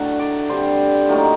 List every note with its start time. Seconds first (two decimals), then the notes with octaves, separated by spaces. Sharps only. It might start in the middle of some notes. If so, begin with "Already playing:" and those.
Already playing: A2 D3 F#3 A3 D4 F#5
0.19 D5
0.49 D3 G3 C4 C5
1.09 A2 F#3 A#3 D#4